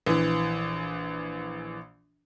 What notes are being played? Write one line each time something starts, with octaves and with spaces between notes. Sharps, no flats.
A#1 E3